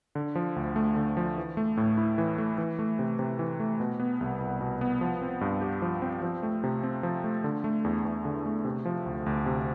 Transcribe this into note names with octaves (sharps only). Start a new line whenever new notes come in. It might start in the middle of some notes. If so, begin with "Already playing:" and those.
D3
F3
D2
A3
D3
F3
E3
A3
A2
E4
E3
A3
E3
A3
C3
C3
E3
A3
B2
B3
C2
C2
B2
B3
F3
C4
G2
G4
F3
C4
F3
A3
C3
C4
F3
A3
D3
A3
E2
E2
D3
A3
C3
F3
D2
D2
C3